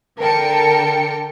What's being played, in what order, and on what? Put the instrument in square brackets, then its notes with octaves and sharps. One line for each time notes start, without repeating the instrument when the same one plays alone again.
[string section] D3 A#4 G5 A5 C#7